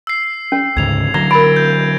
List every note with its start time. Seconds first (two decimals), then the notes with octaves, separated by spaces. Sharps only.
0.07 E6 C7
0.52 C#4
0.77 D2 G#2 C#3 G#6 F7
1.14 D3 F#3 A#5 G#6 A#6 G7
1.31 A#4 B5 A6 D7
1.56 G6